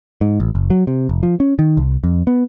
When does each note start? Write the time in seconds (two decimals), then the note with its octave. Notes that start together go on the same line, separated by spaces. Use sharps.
0.21 G#2
0.40 A1
0.55 F#1
0.70 F#3
0.87 C3
1.09 F1
1.23 F3
1.40 C#4
1.59 D#3
1.77 C2
2.04 F2
2.27 B3